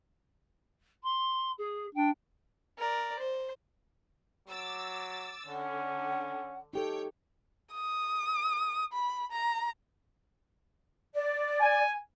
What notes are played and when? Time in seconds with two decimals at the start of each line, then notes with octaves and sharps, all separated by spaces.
1.03 C6
1.58 G#4
1.95 D4 G5
2.78 A#4 D5
3.19 C5
4.48 F#3 D6 E6 A6
5.47 D3 C#4 F#5
6.73 D#4 G4 A4 C#5 G5
7.73 D#6
8.93 B5
9.31 A#5
11.14 D5
11.61 G#5